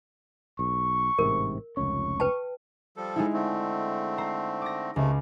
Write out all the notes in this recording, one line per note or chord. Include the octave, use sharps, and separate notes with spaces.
B1 C#6
A1 G#2 C3 A#4
F1 C#2 C#4 C#6
B4 G5 A5
F3 G3 A4
G#3 D#4 E4
D3 A3 C4
C5 A#5
D6 A#6
C#2 C3 A3